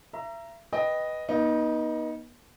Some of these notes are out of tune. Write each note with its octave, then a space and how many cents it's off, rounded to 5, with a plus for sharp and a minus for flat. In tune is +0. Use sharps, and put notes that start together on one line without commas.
E5 +35 A#5 +0
B4 +0 D#5 +0 G5 +10
B3 -40 D#4 +5